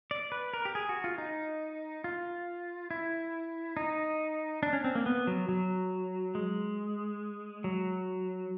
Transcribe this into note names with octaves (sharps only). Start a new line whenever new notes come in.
D5
B4
A#4
G4
G#4
F#4
F4
D#4
F4
E4
D#4
D4
C#4
C4
A#3
B3
F#3
F#3
G#3
F#3